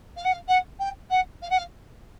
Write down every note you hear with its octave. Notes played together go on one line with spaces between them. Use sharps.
F5
F#5
F5
F#5
G5
F#5
F5
F#5
F5